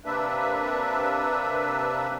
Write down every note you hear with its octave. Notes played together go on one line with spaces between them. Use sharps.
C3 A#3 D4 B4 E5